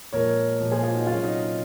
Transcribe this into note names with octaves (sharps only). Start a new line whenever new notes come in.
A#2 F3 G#3 A#4 C#5
A#2 F3 G#3
G#4 C5
F4 G#4
D#4 F#4
C3 F#3 C#4 F4
D#4
D#4